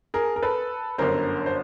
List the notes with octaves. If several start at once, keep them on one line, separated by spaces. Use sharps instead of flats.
G#4 A#4
A#4
A4 B4
G1 F#2 D3 A#4 C5
C5